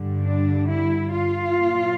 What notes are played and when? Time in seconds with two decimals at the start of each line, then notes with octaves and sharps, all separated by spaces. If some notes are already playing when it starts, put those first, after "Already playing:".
Already playing: G2 D3 G3
0.23 D4
0.67 E4
1.12 F4
1.56 A#2 F#3